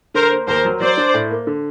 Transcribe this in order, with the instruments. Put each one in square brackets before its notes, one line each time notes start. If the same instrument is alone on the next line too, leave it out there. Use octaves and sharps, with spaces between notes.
[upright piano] D3 [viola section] A#4 C5
[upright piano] A#3
[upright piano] D#2 [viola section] A#4 C5
[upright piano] F#3
[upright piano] F#3 [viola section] C5 D5
[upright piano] D4
A2
A#3
D3